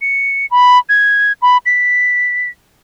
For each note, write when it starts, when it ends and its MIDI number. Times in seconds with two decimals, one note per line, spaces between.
0.01 0.46 97
0.51 0.78 83
0.89 1.32 92
1.42 1.57 83
1.66 2.49 95